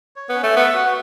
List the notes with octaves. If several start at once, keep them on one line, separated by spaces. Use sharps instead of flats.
C#5
B3
C#4
A3
B3 E5
F#4